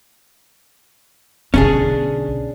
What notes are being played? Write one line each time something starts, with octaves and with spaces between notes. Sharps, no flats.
B1 D3 C#4 D4 G#4